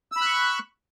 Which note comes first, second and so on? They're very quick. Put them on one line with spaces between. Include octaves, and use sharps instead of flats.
E6 B5 F#6 C#6